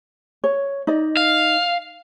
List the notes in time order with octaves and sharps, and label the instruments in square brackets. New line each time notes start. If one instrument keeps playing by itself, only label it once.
[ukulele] C#5
D#4 D5 D#5
[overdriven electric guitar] F5